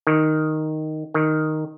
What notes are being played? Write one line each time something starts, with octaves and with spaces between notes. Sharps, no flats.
D#3
D#3